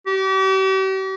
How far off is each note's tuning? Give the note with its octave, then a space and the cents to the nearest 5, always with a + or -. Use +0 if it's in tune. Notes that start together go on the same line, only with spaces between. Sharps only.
G4 -40